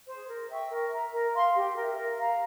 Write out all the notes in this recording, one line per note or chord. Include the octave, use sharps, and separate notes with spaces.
G#4 C5
A#4
E5 G5 C#6
A#4
E5 A#5
A#4
F5 C6
G4
A#4 E5
A#4
F5 A#5